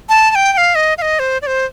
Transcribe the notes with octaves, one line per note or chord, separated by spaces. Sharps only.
A5
A5
G5
G5
F5
D#5
F5
D#5
C5
D5
C5